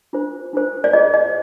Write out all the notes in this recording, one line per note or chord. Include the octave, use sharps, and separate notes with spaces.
D4 F4 C5
D4 F4 C5
D5
F4 G#4 C5 D#5
D#5